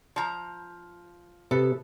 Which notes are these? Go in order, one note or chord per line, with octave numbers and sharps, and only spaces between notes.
F3 A#5
C3 A4 B4